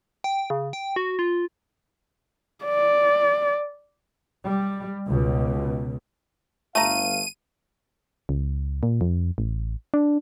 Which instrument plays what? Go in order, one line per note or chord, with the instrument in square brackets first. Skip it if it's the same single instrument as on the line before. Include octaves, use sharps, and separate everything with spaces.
[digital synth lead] G5
C#3
G5
F#4
F4
[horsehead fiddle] D5
[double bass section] G3
C#2 B2
[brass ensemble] G1 F5 [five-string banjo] A3 A#5 [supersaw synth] D#7
[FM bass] C#2
A#2
F2
A1
D4